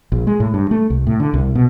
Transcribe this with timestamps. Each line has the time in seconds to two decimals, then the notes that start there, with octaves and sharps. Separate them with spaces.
0.12 A#1
0.27 G#3
0.40 A2
0.54 G2
0.71 A3
0.90 C2
1.07 A2
1.20 D3
1.34 C2
1.55 B2